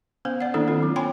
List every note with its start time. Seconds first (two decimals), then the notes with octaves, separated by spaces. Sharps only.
0.25 B3 C#4 C5
0.41 D5 F#5
0.54 D#3 A#3 D4 E4 A4
0.68 C4 F4
0.83 F#3
0.96 C#5 G5 G#5 B5 C6